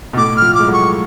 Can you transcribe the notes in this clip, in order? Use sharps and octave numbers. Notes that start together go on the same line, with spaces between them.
B2
A2 D6
F6
F3
D6
G#3
F#3
C#6